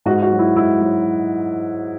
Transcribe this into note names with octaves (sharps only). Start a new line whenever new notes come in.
G#2 F#4
F#4
F#3
E4
G#2 E4
F#3